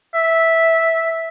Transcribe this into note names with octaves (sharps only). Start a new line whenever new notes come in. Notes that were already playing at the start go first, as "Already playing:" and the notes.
E5